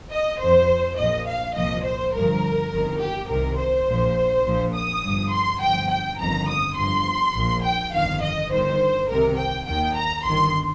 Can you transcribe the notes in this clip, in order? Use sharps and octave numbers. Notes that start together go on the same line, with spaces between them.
D#5
F2 F3 C5
A#1 A#2 F3 D#5
F5
C2 A#2 F3 D#5
C5
G1 G2 F3 A#4
G1 F2 D#3
G4
C2 C3 D#3 A#4
C5
A#1 A#2 F3
A#1 A#2 F3
D#6
G1 G2 F3
C6
G1 G2 F3 G5
G5
G1 F2 D#3 A#5
D#6
G1 G2 F3 C6
A#1 A#2 F3
G5
G1 F2 D#3 F5
D#5
G1 G2 D#3 C5
C2 C3 D#3 A#4
G5
D#2 D#3 G5
A#5
G1 G2 D#3 C6